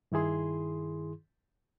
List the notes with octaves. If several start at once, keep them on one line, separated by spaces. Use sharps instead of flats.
G2 D#3 E4 G#4 C6